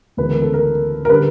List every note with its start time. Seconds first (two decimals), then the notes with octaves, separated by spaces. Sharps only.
0.17 D2 C#3 E3 G#3 B3 B4
0.29 A#4
0.42 A4
0.54 A#4
1.05 A#4
1.09 D3 G3 B4